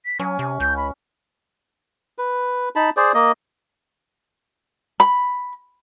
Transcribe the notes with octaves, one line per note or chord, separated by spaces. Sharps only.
B6
F#3 C#4 G#5
C3
C#2 G6
B5
B4
D#4 A5 B5
G#4 C5 D5
A#3 D#5
B5